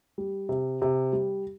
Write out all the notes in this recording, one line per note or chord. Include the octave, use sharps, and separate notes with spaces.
G3
C3
C3
G3